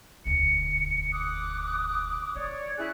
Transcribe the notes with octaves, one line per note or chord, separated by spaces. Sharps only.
E1 D2 C#7
D6 D#6 F#6
E3 C#5 D5
C#4 E4 G#4 F#6